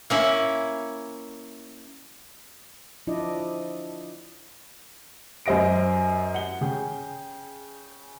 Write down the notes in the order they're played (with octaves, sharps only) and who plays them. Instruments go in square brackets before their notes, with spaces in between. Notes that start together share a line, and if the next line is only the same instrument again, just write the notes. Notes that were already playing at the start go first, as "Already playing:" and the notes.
[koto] A#3 C#4 E4
[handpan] F3 D4 E4 D5 D#5
[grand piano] F#2 C5 D#5 A#6 D7
F#5 G7
C#3 G#4 G5